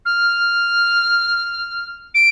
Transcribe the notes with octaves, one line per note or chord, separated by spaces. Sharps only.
F6
D7